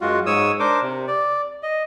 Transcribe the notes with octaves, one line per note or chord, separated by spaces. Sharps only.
F#2 G#3 F4 F#4
G#2 C#5 D#6 E6
D4 A#4 C5 D6
C3
D5
D#5